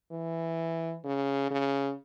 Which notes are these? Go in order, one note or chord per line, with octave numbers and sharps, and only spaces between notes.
E3
C#3
C#3